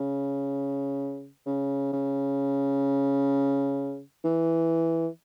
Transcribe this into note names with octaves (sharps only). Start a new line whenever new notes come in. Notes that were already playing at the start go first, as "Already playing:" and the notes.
Already playing: C#3
C#3
C#3
E3